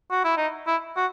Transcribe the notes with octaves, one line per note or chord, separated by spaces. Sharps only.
F#4
E4
D#4
E4
F#4